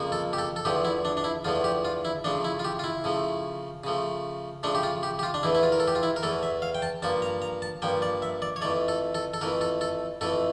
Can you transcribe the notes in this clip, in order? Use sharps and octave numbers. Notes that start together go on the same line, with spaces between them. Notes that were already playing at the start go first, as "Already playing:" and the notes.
Already playing: F2 C#3 F3 A#3
A4
G4
A4
A4
E2 D3 F3 A3 G4
E4
D4
D4
E4
E2 D3 F3 A3 F4
G4
F4
E4
C#3 F3 A3 D4
E4
F4
G4
F4
E4
C#3 F3 A3
C#3 F3 A3
C#3 F3 A3 D4
G4
F4
G4
G4
F4
D4
E2 E3 A3 E4
E4
F4
A#4
A4
G4
F4
E4
A#4
E2 E3 A3 A4
E5
F5
G5
A5
G2 F3 A#3 A5
A#5
A#5
A5
G2 F3 A#3 G5
D5
E5
D5
C#5
F2 E3 A3 D5
A4
A4
A4
F2 E3 A3 A#4
A4
A4
F2 E3 A3 A4